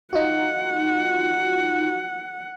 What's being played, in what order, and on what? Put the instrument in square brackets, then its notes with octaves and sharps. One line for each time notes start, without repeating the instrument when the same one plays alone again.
[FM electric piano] D#4 F4 F#4 [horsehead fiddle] F#5